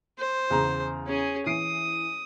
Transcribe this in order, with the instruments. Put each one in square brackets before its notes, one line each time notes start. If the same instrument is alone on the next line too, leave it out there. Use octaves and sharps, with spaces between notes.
[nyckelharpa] C5
[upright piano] E2 C#3 A#5
[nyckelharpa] C#4 G#4
[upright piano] E3 C7 D7 [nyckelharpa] D#6